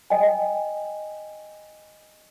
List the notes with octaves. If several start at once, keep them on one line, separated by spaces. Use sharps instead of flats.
D#5 G5 G#5